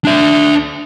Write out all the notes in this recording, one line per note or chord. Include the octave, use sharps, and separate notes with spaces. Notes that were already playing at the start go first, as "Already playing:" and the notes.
D4 E5